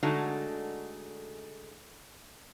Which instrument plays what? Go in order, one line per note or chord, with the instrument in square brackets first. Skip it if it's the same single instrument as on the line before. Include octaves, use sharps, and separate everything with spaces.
[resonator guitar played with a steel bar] D3 G#3 A3 D4 D#4 F#4